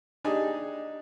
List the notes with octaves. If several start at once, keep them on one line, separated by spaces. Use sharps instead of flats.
D4 D#4 G4 G#4